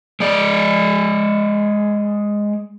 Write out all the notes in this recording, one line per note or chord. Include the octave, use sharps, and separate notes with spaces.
G#3 D5